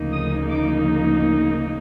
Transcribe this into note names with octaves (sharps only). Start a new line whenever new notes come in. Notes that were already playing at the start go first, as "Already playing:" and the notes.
Already playing: D2 C#3 F3 A#3 D#4
D#6
D6